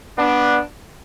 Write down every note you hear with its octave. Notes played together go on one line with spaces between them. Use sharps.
B3 D4